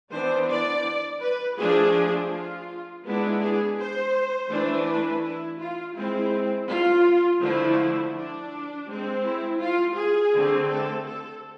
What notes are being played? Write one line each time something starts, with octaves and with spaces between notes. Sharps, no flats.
E3 B3 D4 C5
D5
B4
F3 A3 D4 G#4
F4
G#3 B3 D4 E4
G#4
C5
E3 A3 D4
B4
E4
F4
G#3 C4 E4
F4
D3 F3 A3 E4
D4
G#3 C4
E4
F4
G#4
D3 A3 C4
A4
A4